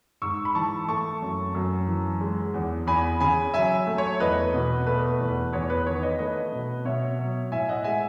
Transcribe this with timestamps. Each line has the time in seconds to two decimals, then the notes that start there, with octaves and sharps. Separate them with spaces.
0.22 G#2 C#6 E6
0.45 B5
0.55 E3 A5 C#6
0.88 A3 A5 C#6
1.22 F#2
1.55 F#2
1.88 E3
2.21 G#3
2.54 E2
2.87 E2 G#5 B5
3.20 C#3 G#5 B5
3.54 F#3 E5 G#5
3.87 A3
3.98 C#5
4.20 E2 B4 D#5
4.53 B2
4.87 A3 B4
5.20 E2
5.53 E2 C#5
5.70 B4
5.86 D#3 C#5
6.03 B4 D#5
6.19 A3 B4 D#5
6.52 B2
6.85 B2 C#5 E5
7.19 F#3
7.51 A2 E5 G#5
7.69 D#5 F#5
7.84 G#3 E5 G#5